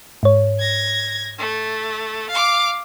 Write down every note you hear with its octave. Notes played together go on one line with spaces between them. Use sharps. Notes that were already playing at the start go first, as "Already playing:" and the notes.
G#2 C#5
G#6 A#6
A3
F5 D6